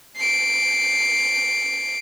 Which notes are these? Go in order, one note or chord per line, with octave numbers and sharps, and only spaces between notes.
C7 D7